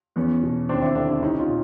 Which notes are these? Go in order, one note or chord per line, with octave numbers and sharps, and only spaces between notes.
E2 B3 C#4
B2
D#2 C4 D4
D4 E4
D3 D4 E4
D4 E4
C2 C#4 D#4
D#4 F4
A#2